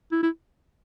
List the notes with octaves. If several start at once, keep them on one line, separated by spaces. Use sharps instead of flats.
E4
E4